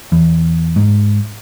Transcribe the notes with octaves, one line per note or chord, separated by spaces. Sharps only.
E2
G#2